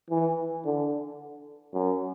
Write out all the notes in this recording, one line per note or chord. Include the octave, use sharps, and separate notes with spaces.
E3
D3
F#2